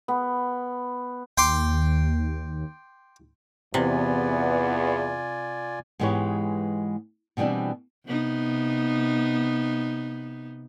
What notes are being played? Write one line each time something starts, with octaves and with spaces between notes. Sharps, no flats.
B3
D#2 G5 C6 D6
E2 C3 B3 F4 D5 G#5
G#2 E3 G#3 B3 G4 C#5
B2 E3 G3 C4 D4
C3 B3 D#4